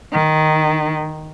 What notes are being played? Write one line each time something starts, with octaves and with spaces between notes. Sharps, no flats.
D#3